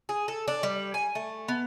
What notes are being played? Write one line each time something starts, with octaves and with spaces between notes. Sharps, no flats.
G#4
A4
D4
G3
G#5
A3
B3